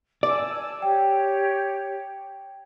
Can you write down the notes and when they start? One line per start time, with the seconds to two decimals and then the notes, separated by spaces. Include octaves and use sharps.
0.23 D5 G#5 A5 E6
0.82 G4 C#5 G5